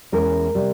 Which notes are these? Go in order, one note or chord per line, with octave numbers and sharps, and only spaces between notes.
E2 E3 G#3 C#4 A#4
C3 G3